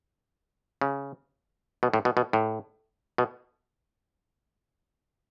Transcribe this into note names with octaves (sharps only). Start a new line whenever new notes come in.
C#3
B2
A2
B2
B2
A2
B2